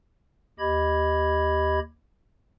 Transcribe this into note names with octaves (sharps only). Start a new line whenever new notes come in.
D#2 G4 D#5 B5 G#6